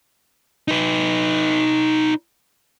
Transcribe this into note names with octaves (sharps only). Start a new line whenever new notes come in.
D#4 B4